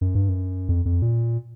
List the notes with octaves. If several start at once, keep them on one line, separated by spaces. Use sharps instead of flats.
F#2
G2
F#2
F2
F2
A#2